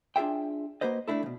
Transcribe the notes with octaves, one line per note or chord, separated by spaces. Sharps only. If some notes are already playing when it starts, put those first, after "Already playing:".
D4 F4 G#4 E5 G5
A#3 F#4 B4 C5 D#5
A3 C4 D4 E4 A4
E2 B2